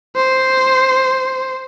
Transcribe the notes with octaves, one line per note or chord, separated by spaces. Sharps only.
C5